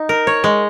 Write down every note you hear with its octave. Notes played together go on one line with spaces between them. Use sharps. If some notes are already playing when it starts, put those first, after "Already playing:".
Already playing: D#4
A#4
C#5
G#3